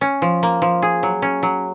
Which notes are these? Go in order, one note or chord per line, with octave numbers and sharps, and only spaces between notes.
C#4
F3
A#3
F3
G#4
F#3
C#4
F#3